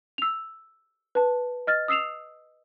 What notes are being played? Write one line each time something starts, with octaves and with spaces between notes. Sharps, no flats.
E6 F7
B4 A5
D#5 F6 A6
D#6 E6 C7 E7 F7